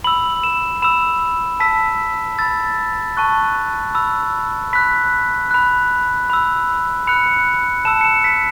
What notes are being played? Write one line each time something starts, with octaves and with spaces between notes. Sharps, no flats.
B5 E6 F#7
E7
B5 E6 E7
A5 E6 B6
B5 E6 A6
A5 C#6 F#6
B5 E6
B5 F#6 B6
B5 F#6
B5 E6
B5 F#6 C#7
A5 E6 E7
C#7
E7
B6